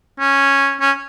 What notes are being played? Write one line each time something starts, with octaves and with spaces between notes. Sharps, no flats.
C#4
C#4